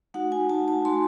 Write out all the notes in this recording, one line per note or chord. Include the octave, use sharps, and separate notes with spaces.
A3 D#4 F#4 F#5
G#5
A5
A5
A3 D#4 F#4 C6